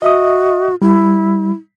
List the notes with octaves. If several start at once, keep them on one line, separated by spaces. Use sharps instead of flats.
F#4 D#5 E5 D#6
G3 E4